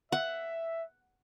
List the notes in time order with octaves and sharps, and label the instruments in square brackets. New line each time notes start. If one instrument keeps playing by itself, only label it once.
[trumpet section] E5 [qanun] F#5